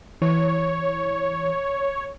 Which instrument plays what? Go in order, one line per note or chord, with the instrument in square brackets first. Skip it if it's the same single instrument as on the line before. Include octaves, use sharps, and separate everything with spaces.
[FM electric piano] E3 [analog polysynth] C#5